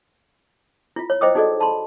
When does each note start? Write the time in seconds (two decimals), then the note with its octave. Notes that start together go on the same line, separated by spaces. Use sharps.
0.96 E4 F4
1.10 C#5
1.21 E4 C5 D#5 G5 D6 D#6
1.35 D#4 F#4 G#4 A4 D5 D#5
1.60 A5 B5 C6